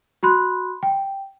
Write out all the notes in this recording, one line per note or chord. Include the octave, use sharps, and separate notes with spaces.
F#4 B5 C6 F#6
G5